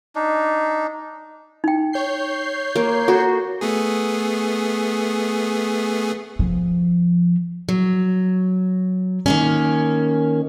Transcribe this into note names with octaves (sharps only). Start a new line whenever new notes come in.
D4 D#4
D#4 G5
C#5 G6 C7
A#3
F#4 A4 A#5
A3 B3 G#4
F3
F#3
D#3 A#3 C#4